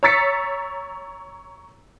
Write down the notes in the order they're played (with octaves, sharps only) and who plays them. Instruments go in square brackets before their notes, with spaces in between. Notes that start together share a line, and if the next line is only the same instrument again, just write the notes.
[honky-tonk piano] C#5 A#5 E6 A6 B6 C#7